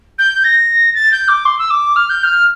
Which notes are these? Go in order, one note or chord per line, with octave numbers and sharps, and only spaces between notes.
G6
A#6
A6
G6
D6
C6
E6
D6
F6
G6
F6